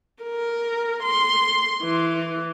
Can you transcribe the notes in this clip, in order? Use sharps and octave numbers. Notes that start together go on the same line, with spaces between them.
A#4
C6
E3